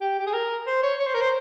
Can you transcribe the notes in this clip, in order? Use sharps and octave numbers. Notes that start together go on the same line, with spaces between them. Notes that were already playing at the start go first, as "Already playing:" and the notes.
G4
G4
G#4
A#4
C5
C#5
C#5
C5
A#4
C5